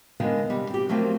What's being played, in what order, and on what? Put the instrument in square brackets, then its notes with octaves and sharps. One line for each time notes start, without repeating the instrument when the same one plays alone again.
[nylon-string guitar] D3 D#3 G#3 B3 F5 G#5
C3 G3
C4 G4
F3 F#3 A3 A#3 C4 F4